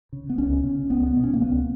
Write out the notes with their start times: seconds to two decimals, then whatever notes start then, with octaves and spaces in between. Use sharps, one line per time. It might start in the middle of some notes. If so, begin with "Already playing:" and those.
0.13 C#3
0.30 B3
0.38 C#2 C#4
0.64 C#3
0.90 C#2 B3
1.06 B3
1.16 B2
1.23 C#4
1.34 A#3
1.41 C#2 B3